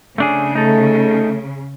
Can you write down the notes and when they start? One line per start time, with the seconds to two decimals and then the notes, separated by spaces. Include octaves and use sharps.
0.18 C#3 A3 D4 G#4
0.55 A3 D#4 A4